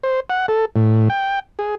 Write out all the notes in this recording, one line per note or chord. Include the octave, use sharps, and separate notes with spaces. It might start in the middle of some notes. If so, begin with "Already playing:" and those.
C5
F#5
A4
A2
G5
G#4